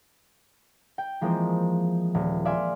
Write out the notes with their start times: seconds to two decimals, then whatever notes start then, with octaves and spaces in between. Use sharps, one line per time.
0.98 G5
1.21 E3 F3 G#3 A#3 C4
2.14 D#1
2.45 D5 E5 F5 G#5 C6